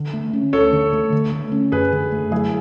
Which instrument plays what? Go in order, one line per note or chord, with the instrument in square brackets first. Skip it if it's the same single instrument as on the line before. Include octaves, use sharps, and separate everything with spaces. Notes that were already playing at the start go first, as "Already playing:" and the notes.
Already playing: [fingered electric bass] D3
A3
C#4
[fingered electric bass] D2 [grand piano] A4 C#5
[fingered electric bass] D3
A3
D3
A3
C#4
[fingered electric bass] F#2 [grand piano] G#4 B4
[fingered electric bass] D3
A3
[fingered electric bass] F#3 [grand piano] E4 G#4